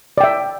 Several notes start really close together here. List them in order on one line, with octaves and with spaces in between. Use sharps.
D5 G5 E5